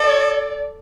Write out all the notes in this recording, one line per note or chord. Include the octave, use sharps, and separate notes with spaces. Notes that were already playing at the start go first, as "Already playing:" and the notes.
Already playing: A4 D5